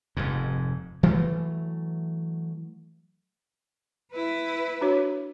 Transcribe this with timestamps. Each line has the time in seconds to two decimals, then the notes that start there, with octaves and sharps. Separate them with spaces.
0.17 F1 F2 G#2
1.03 E3 F#3 A3
4.12 E4 B4
4.81 D4 F#4 C#5